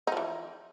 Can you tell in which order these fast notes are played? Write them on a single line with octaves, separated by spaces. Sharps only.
D#4 F3 E3